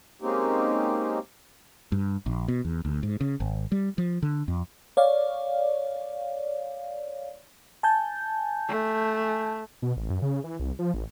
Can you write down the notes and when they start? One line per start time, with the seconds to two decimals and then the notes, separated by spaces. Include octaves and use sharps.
0.22 G#3 A#3 C4 C#4 D#4 G4
1.92 G2
2.26 A#1
2.48 B2
2.65 E2
2.85 D2
3.03 G#2
3.21 C#3
3.40 G#1
3.72 G3
3.98 F3
4.23 D3
4.48 F2
4.97 C#5 D5 F5
7.83 G#5 A5 G6
8.68 A3
9.82 B2
9.97 A1
10.10 F#2
10.22 C#3
10.44 E3
10.59 C2
10.79 F3
10.94 A1